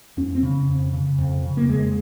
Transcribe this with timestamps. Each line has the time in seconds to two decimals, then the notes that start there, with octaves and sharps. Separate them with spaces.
0.17 F2 C#4
0.35 C4
0.43 C#3
0.68 F2
0.93 C#3
1.18 F2
1.43 C#3
1.57 A#3
1.69 F2 G#3